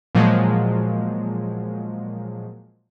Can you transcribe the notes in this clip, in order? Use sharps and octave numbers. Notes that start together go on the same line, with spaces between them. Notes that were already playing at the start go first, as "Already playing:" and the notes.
A#2 F3 F#3 G#3